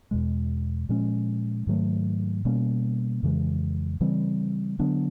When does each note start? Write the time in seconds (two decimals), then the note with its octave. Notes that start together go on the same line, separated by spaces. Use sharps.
0.11 E2 B2 G#3
0.89 A#2 F3 G#3 C#4
1.67 G#2 D#3 F#3 A3
2.45 B2 G3 A#3 C#4
3.23 F2 C#3 E3 G#3
4.01 C#3 E3 G3 C4
4.79 D3 F#3 B3 D4